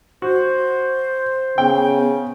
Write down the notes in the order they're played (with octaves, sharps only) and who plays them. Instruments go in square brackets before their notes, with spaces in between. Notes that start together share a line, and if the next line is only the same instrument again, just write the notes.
[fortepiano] F#4 [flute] C5
[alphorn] C#3 [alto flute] B3 [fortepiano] G5